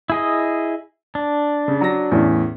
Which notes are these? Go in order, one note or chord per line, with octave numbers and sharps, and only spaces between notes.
E4 G#4 D#5
D4
C#3
F#3 A#6
E2 A2 C#4